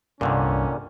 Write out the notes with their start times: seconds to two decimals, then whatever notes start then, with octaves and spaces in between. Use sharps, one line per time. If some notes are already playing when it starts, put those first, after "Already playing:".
0.21 C2 G2 A#2 D3 D#3 C#4